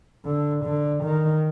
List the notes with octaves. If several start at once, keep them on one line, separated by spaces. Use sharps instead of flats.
D3
D3
D#3